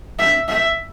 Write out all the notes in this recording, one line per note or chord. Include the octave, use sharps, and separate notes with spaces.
E5
E5